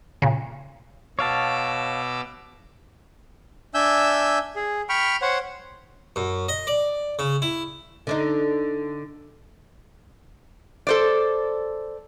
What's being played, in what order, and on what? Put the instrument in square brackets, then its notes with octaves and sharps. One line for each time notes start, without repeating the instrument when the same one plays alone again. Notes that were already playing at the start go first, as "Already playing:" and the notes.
[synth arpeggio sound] A#2 C#3
[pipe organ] B2 D6 E6 [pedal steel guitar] C#5 F5 A5
[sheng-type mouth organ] D4 E5 G#5 E6 G6
G#4
G5 B5 C#6 F6
C5 C#5 F#5
[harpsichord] F#2
D#5
D5
C#3
E4
[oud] D3 D4 D#4
[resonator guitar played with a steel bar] A4 C5 D5